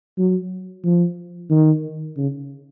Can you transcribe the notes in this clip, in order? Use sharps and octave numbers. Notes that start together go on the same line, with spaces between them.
F#3
F3
D#3
C#3